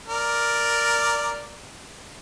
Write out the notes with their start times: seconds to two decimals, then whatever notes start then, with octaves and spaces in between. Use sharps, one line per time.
0.08 A#4 D5